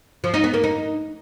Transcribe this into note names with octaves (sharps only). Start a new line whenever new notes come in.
F3
D#4
B3
A#3
D#4